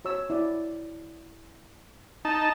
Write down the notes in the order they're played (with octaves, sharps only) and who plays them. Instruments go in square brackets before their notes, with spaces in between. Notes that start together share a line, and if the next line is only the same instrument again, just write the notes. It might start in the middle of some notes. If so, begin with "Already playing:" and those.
[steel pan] F#4 C#5 E6
E4 D5
[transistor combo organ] D#4 A5